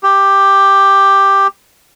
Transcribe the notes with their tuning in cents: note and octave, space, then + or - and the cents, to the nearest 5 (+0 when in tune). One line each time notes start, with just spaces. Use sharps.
G4 +5